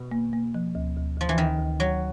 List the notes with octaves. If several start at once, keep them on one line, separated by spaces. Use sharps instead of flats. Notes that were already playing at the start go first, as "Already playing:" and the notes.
Already playing: B2
A#3
A#3
F3
D2
D2
D2 F3
E3
D2 D#3
D2
D2 F#3